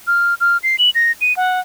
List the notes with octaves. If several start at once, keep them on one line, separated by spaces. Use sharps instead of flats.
F6
F6
C7
F#7
A#6
D#7
F#5